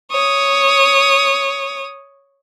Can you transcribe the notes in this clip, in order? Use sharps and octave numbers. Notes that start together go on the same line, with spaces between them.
C#5 D#6